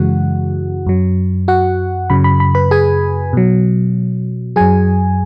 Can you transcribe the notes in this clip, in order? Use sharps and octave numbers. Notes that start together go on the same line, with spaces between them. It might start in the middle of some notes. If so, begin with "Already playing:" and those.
Already playing: F#2 C#3 E3 G#3 F#4 F#5
F#2 F#3
F#4 F#5
F#2 C#3 F#3 B5
B5
B5
B4 B5
G#4 G#5
B2 F#3
F#2 F#3 G#4 G#5